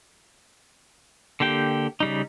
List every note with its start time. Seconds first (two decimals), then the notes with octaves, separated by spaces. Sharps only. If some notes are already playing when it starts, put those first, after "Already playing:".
1.40 D3 A#3 G4 G5
2.00 C#3 G3 D#4